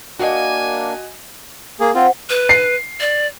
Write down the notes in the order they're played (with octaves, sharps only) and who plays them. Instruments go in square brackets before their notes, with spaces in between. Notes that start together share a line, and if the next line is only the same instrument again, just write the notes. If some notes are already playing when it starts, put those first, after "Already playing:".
[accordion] A#3 D4 [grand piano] F#4 D#5 [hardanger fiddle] G#5
[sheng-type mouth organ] A#3 G#4
[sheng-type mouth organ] C4 F4 [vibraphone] C5 F#5
[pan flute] B4
[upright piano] C7
[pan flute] D5